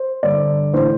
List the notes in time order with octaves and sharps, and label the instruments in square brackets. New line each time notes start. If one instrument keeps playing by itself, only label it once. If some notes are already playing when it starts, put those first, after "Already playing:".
Already playing: [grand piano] C5
G2 D3 D5
A2 E3 C5